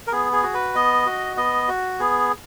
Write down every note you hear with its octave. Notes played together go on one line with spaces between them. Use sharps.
A#4
B3 G#4
G#4
F#4
B4
B3 D#5
F#4
B3 D#5
F#4
B3 G#4